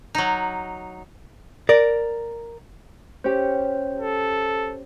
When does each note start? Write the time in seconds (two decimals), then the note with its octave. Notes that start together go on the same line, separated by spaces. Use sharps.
0.15 F#3 D#4
1.69 A#4 D5
3.24 C#4 G4 C5
4.00 A4